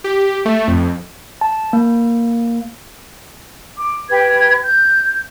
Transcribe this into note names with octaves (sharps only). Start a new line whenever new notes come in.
G4
A3
F2
A5
A#3
D6
G4 B4 G#6
G6